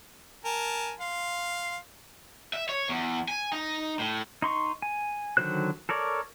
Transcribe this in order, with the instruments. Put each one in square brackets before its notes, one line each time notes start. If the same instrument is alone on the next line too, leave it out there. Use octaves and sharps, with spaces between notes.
[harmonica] A#4 G#5 A5
F5 C6
[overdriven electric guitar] E5
C#5
E2
G#5
D#4
A2
[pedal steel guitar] D#4 C6 C#6
G#5
D3 D#3 F#3 C5 F#6
A4 A#4 C#5 D5